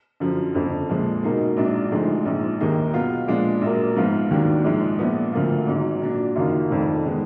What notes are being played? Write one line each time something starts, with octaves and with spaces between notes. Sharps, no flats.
F#2 D3 F3
F#1 F2 D3
A#1 A#2 F3 G#3
B2 A#3 D#4 G#4
A#1 G#2 F#3 D4
D2 D3 F3 G#3 D#4
A#1 G#2 F3
D#2 D#3 A#3 D#4 G#4
B2 F#3 B3 F4
A#2 F3 G#3 D4
A#1 A#2 F#3 A#3
G#2 F3 B3 F4
D#2 D#3 F#3 D4
A#1 G#2 F3 G#3
A#1 A#2 F3 B3
D2 D3 F3 A#3 F4
G#1 G#2 F#3
A#2 F#3 D4
F#1 F#2 D#3 A#3 F4
F1 F2 D#3
D#3 G#3 B3